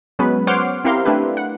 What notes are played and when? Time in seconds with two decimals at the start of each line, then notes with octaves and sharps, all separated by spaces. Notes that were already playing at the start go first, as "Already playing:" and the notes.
0.19 F#3 G#3 B3 C#4 B4
0.47 C5 C#5 F#5 C6 D6 F6
0.84 C4 E4 G4 A#4 F5 C6
1.05 A3 D4 E4 G4 B4
1.37 F#5